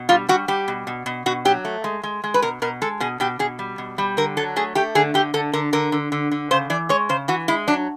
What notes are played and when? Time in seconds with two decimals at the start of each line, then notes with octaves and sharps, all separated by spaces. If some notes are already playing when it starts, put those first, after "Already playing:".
Already playing: B2
0.09 G3 F4
0.29 G3 F#4
0.48 G3 G4
0.68 B2
0.87 B2
1.06 B2
1.26 B2 F#4
1.45 F#3 G4
1.65 A3
1.84 G#3
2.03 G#3
2.24 G#3
2.34 B4
2.42 B2 A#4
2.62 B2 A#4
2.82 G#3 A4
3.00 B2 G#4
3.20 B2 G4
3.39 B2 G#4
3.59 G3
3.78 B2
3.98 G3
4.17 D3 A#4
4.37 F#3 A4
4.56 A3 G#4
4.75 A3 G4
4.95 D3 G#4
5.14 D3 G4
5.34 D3 A4
5.53 D3 A#4
5.73 D3 A#4
5.92 D3
6.12 D3
6.31 D3
6.51 C#3 C5
6.70 E3 D5
6.89 G#3 C#5
7.09 C#3 C5
7.28 E3 F#4
7.48 G#3 E4
7.67 F#3 D4